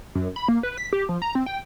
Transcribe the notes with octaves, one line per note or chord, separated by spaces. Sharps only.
F#2
B5
A#3
B4
B6
G4
F3
A#5
C4
G5